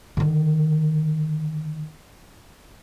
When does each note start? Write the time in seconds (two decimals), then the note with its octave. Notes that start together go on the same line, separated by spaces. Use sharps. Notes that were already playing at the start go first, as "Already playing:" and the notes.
0.17 D3 D#3